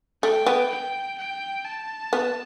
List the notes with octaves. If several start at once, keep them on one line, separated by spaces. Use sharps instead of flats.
A3 G5
B3
G5
G5
A5
B3